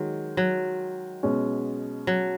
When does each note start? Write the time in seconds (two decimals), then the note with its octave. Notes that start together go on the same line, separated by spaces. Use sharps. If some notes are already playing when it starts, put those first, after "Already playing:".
Already playing: D#3 F#3 G#3
0.37 F#3
1.23 B2 G#3 C#4
2.07 F#3